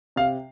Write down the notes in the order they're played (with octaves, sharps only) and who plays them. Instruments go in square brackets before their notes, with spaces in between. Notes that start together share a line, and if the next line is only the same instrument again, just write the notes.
[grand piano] C3 F5